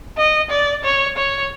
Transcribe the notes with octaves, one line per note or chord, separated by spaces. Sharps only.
D#5
D5
C#5
C#5